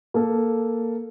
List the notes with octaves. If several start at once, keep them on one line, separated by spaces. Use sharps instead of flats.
A#3 A4